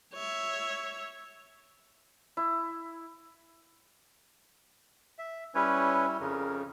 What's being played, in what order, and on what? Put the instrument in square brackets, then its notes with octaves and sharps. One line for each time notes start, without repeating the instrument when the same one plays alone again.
[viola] C#5 E5
[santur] E4
[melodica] E5
[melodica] G3 E4 [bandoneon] C#4 B4 C#5
[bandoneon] F2 C#3 [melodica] A#4